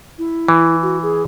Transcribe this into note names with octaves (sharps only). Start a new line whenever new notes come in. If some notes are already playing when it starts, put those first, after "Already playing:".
E4
E3
F#4
G#4